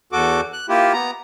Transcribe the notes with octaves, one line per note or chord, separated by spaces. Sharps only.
E2 F#4 A4 D6
F#6
A#3 E4 F4 G4
B3 A#5